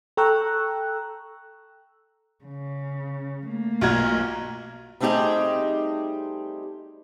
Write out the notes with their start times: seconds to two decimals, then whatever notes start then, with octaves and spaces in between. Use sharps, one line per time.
0.17 A4 G5 A#5 C#6 E6 F#6
2.45 C#3
3.46 A3 A#3
3.81 B1 F4 F#4 A#5 F6 G#6
5.00 G3 A3 C4 D#4 G4 G#4